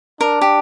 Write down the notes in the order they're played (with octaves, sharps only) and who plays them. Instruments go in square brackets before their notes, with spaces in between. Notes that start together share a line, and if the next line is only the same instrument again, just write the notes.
[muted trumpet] D4 [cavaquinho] A#4
[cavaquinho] G4